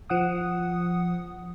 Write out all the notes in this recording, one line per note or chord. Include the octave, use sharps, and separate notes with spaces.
F3 F#5 D#6